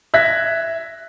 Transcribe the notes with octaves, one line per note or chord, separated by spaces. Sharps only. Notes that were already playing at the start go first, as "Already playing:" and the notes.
E5 F#6 G#6 A#6 B6